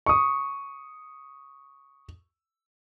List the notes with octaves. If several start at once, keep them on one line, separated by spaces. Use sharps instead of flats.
C#6 D#6